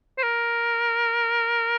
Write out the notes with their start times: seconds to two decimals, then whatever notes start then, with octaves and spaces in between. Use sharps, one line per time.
0.18 C5
0.23 A#4